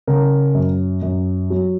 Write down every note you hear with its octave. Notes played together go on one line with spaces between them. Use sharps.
C#3 A#4
F#2
F#2
F#3